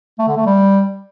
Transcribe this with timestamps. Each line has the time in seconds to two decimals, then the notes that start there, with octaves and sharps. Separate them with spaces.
0.19 A3
0.28 D3
0.37 A3
0.46 G3